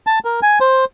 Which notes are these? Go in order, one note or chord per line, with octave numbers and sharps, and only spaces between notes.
A5
A#4
G#5
C5